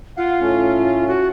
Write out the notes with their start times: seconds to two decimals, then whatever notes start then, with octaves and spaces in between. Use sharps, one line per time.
0.18 F4 F5 F#5
0.41 A2 A3 C#4
1.08 F#4